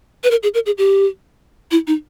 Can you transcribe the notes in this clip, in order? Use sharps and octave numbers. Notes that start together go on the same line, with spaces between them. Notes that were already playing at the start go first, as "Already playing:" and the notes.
B4
A#4
G#4
A#4
G#4
G4
E4
D#4